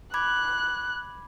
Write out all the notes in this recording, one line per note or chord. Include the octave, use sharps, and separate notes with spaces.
B5 D6 F#6 G#6